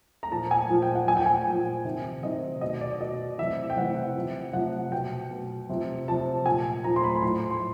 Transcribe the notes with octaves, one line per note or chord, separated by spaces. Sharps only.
A#5
A#2 F3 A5
G#5
A#2 F3
G5
F#5
A#2 F3 G#5
G5
G#5
A#2 F3
C3 D#3
C3 D#3 D#5
B2 D#5
D5
B2 D#5
C3 E3 E5
G5
C3 E3 F#5
C3 F3
C3 F3 F#5
B2 G5
B2
C3 F3
C3 F3 A5
A#2 F3 G#5
A#2 F3 A#5
C6
B5
B5
A2 F3 C6
C6